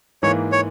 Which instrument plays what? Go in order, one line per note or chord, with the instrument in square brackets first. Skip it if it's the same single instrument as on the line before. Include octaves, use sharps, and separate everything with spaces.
[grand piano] G#2 E3 A#3 [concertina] C#5
[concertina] C#5